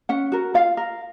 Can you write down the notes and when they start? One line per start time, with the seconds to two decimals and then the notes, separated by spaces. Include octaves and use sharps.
0.09 C#4 F#5
0.32 F#4 A#4
0.54 F4 F5
0.77 A#4